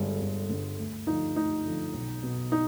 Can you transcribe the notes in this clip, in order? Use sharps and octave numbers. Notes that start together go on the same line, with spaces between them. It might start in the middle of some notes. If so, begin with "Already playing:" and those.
Already playing: G1 G2 D3 G#3
G1
G2 D3
D2
D3 F3 D#4
D2 D#4
D3 F3
B1
B2
D#4